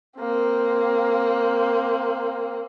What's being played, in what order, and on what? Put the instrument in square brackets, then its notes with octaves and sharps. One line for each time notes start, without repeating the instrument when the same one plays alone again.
[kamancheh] A#3 C4